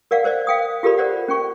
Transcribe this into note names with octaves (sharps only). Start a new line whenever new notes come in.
A#4 D5 F5 F#5
A#4 C5 D5 D#5
F5 G5 D#6
F4 G4 A4 A#4 D5 B5
A#4 C5 D5 F#5
C#4 G5 C#6